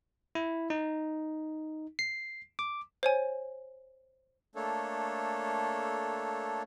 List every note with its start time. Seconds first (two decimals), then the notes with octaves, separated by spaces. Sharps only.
0.35 E4
0.70 D#4
1.99 C7
2.59 D6
3.03 C5 C#5 G#5
4.56 A3 A#3 D4 A4 C#5